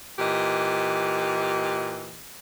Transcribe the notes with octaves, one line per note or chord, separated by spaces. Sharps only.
A#2 E3 G4 D#5